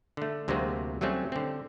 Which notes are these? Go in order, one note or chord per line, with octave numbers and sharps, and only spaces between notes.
D3 A3
D2 C3 F#3 G#3 A#3 C4
F#3 G3 A3 C4 C#4
D3 C4